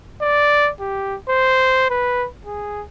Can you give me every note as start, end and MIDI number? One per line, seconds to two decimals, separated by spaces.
0.21 0.70 74
0.80 1.16 67
1.29 1.88 72
1.90 2.27 71
2.45 2.83 68